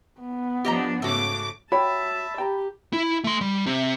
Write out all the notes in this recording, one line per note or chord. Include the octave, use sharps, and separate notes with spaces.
B3
F3 D4 G4 D#5 A#5
G#2 C#3 A3 F#4 D6
F#4 C#5 E5 G5 A5 B5
G4 G5 A#5
E4
A3 C6
G3
C3